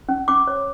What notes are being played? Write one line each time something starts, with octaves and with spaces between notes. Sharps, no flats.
C#4
C#4 D6
C#5